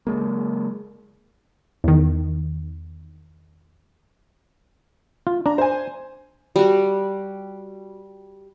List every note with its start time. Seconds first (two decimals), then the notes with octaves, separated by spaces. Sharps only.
0.07 C#3 F#3 G#3 A#3
1.84 E2 D#3
5.27 F4
5.46 D4 A#5
5.58 C5 G#5
6.56 G3 F#4